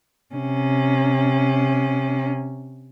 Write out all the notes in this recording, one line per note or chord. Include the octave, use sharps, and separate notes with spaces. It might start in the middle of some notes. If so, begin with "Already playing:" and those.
C3 C#4